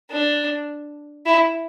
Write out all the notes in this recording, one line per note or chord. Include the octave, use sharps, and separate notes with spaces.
D4
E4